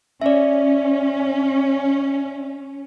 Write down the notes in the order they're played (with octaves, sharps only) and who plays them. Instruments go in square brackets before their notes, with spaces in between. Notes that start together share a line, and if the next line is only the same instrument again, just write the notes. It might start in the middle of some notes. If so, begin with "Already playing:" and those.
[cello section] C#4 [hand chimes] D5 E5